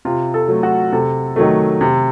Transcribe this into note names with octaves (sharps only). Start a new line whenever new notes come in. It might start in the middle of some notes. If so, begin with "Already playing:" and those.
C3 F4
A4
F#3 A3
F#4
C3 A4
D#3 F#3 A3
C3